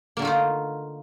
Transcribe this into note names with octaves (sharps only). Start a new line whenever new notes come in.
D3 A3 A#3 D#4 F4